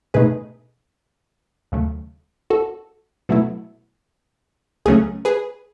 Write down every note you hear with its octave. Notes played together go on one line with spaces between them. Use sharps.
B2 A3 D#4 G#4 B4
D#2 C#3 F#3 A3
F#4 A4
B2 F#3 A3 E4
C#2 C#3 F#3 A3 C#4 G#4
G#4 B4